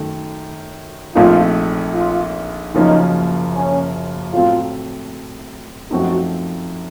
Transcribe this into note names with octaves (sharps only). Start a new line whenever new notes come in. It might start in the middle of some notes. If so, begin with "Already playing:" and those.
Already playing: F#2 D#3 A3
A#1 A#2 A3 C4 D#4 F4
F4
F#1 F#2 F3 A#3 C#4 D#4
C#4
A2 F#3 A3 C4 F4
F#2 F3 A3 C4 D#4 F#4